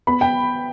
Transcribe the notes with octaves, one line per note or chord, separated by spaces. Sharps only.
B3 B5
G5